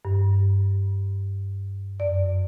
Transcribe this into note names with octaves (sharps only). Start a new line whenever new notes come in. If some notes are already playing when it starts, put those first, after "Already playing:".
G2
F#2 D5